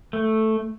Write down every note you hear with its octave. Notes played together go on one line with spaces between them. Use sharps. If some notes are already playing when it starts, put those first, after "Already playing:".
A3